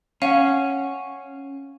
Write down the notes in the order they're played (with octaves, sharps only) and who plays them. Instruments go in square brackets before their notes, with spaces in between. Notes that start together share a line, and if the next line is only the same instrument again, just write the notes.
[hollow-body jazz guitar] C#4 [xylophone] F5 F#5